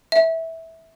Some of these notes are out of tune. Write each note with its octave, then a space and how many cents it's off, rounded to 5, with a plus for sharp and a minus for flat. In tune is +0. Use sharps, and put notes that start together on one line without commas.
E5 -15